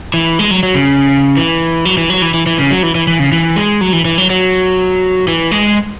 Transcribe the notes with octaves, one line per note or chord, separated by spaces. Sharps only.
E3
G#3
F#3
F#3
C#3
E3
F#3
E3
F#3
E3
E3
E3
C#3
F#3
E3
E3
E3
C#3
E3
G#3
F#3
E3
E3
F#3
F#3
E3
G#3